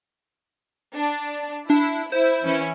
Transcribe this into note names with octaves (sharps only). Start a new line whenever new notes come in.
D4
D4 E4
E4 C5
E3 C#4 E4